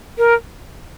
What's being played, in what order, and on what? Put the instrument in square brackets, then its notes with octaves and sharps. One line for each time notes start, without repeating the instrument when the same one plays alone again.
[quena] A#4